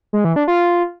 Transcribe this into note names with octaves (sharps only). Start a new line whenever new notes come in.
G#3
E3
D4
F4